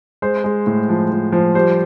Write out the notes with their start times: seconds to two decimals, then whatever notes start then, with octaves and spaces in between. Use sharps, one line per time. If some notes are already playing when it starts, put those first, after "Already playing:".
0.22 G#3 C5
0.44 G#3
0.67 A2
0.89 F3
1.11 F3
1.32 F3
1.55 G3 C5